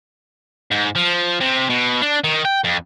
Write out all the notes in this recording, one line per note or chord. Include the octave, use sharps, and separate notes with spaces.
G#2
F3
C3
B2
D4
D#3
G5
F2